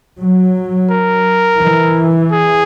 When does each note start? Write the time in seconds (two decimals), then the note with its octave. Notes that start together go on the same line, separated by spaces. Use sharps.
0.19 F#3
0.90 A#4
1.61 E3
2.31 G#4